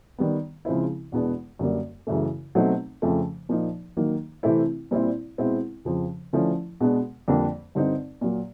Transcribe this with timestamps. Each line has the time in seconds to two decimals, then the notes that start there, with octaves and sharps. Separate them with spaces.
0.18 D#3 G3 B3
0.65 C#3 F3 G#3 C4 E4
1.12 E2 B2 G#3 B3 D4
1.59 F#2 D3 G3 A#3
2.07 F#2 C#3 E3 A3
2.55 B2 F#3 A3 C4 D#4
3.02 F2 C#3 F3 A3 C#4
3.49 A#2 F3 A#3 D#4
3.97 D#3 F#3 A#3 D#4
4.43 C3 E3 A3 C4 E4
4.91 A#2 G3 C4 E4
5.38 B2 G#3 C4 E4
5.85 F2 C#3 F3
6.33 D3 F3 A3 C#4 E4
6.80 B2 G#3 B3 D4
7.28 F2 D3 G3 A#3 D4
7.75 G2 D3 G3 C4 D#4
8.21 A#2 F#3 A#3